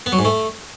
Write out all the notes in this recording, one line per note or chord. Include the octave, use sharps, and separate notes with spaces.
B3
F#3
G#2
A3